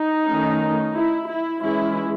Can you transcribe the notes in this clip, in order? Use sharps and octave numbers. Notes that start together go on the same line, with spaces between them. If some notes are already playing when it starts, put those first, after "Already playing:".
Already playing: D#4
D#3 A3 C#4
E4
E4
E3 G#3 C#4 E4